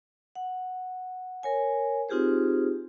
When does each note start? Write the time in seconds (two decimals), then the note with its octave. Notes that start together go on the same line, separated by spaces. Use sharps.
0.36 F#5
1.43 A#4 C#5 G#5
2.09 C4 D#4 F4 G4 G#4 C5